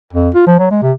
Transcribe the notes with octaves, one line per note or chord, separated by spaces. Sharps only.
F2
F4
F3
F#3
G#3
C3